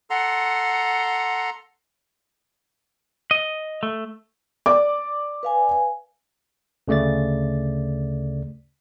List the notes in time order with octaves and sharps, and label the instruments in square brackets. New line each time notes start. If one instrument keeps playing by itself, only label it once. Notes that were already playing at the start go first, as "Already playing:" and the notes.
[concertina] A4 A#5 C6 [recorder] F#5
[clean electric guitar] D#5
A3
[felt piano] D5 D6
[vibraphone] B4 F5 G#5
[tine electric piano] D2 C#3 A3 D5 A6